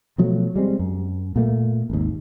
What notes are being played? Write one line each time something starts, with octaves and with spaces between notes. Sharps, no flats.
B2 F3 F#3 A3
G3 G#3 C4
F#2
A#2 A3 A#3
G#1 D#2